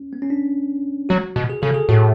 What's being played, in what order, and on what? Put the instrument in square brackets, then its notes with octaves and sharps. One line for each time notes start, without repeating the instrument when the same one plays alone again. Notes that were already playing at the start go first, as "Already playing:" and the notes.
Already playing: [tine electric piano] C#4
B3
C#4
D4
[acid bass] F#3 [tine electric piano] F#4
[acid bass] B2
[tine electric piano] G#4
[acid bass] C#3 [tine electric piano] A4
[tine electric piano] G#4
[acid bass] A2 [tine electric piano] F#4